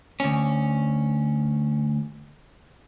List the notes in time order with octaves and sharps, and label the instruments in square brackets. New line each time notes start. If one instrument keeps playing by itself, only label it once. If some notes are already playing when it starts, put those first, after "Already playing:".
[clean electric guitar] D2 C#4